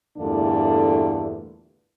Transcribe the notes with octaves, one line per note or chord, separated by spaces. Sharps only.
E2 G2 A#2 D3 A3 D4